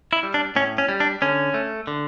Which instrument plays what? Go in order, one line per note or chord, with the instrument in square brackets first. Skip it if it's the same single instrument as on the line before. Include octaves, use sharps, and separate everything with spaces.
[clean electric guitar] E4
G3
D4
A2 C#4
C#4
G3
D4
D3 C#4
A3
D3